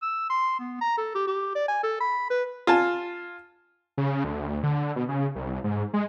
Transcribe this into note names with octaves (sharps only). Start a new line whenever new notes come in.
E6
C6
B3
A#5
A4
G4
G4
D5
G#5
A4
B5
B4
F4 G#5 A5
C#3
D2
D3
B2
C#3
C2
G#2
G#3